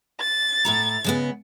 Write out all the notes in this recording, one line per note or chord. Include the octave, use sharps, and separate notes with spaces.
A6
A2 E4 A#5
C#3 G#3 B3